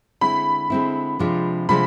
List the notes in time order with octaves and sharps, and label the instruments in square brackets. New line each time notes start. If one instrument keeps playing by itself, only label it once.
[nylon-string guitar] D3 G#3 C4 E4 [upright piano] B5
[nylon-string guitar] D3 G#3 C4 E4
C3 F3 G#3 D4 F4
[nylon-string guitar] C3 F3 G#3 D4 F4 [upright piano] B5